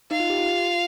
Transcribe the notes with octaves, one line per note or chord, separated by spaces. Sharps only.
D#4 F5
F4
G4
F4